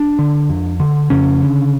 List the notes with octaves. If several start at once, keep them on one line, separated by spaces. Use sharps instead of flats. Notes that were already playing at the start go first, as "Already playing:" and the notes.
Already playing: D4
D3
F2
D3
F2 C#3 C#4
D3